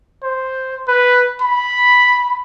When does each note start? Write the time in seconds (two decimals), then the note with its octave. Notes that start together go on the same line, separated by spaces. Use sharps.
0.23 C5
0.88 B4
1.42 B5